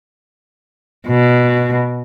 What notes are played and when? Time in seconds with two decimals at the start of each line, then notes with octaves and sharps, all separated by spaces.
1.07 B2